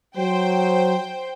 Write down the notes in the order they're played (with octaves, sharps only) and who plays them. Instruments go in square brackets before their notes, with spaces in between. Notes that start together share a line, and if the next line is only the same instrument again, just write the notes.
[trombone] F#3 [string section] C5 G5